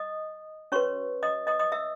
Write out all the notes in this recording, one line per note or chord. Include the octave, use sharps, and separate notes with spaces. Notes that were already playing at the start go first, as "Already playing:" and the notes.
Already playing: D#5 D#6
C#4 F#4 B4 C#5 C#6
D#5 D#6
D#5 D#6
D#5 D#6
E5 E6